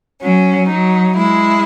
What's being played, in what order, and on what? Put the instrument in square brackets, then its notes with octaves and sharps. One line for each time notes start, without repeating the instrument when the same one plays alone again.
[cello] F#3 [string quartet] C#4
[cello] F#3 [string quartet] D#4
[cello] G#3 [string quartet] E4